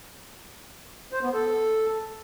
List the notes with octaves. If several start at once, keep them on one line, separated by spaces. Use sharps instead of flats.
C5
B3
A4